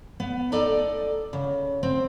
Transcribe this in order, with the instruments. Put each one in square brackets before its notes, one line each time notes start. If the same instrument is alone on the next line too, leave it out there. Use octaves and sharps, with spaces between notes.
[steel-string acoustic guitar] B3
D#4 A4 D5 D#5
C#3
C4